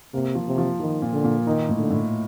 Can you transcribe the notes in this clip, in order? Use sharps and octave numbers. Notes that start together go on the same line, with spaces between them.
C3 A#3
F3
C3
F3
D#3 F3
A#2
D3
A#2
D#3 D#4
A2
D3
A2